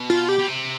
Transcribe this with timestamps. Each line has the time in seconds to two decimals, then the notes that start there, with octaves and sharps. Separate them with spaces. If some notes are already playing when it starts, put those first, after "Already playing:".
Already playing: B2
0.10 F4
0.29 G4
0.39 B2
0.48 C3